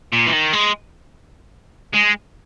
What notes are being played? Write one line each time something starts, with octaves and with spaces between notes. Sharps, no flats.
A#2
E3
D#3
G#3
G#3